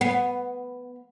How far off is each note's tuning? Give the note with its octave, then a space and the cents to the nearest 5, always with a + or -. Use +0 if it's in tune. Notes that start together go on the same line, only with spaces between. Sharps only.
B3 +5